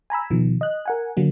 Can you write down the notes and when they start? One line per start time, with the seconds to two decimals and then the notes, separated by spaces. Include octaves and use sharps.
0.10 G#5 A#5 B5 E6
0.30 B2 D#3 F3
0.61 D#5 F#6
0.86 A#4 F#5 G#5
1.17 D3 F#3 A#3